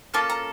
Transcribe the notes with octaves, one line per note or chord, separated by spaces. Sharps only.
A#3 C#4 F4 A4 A5
A#5